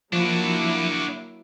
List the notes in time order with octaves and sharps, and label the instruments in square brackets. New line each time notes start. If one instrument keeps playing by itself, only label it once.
[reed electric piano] F3 [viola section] F#3 A#3 E4 [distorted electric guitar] D4 F#4